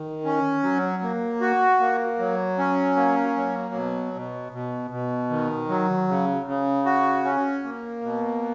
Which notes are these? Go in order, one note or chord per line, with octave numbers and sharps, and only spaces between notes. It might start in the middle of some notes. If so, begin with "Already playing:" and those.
Already playing: D#3
C#4
F#3
A#3
F#4
A#3
F#3
C#4
A#3
F#3
B2
B2
B2
B2
D#3
F#3
C#3
C#3
F#4
C#4
A#3
B2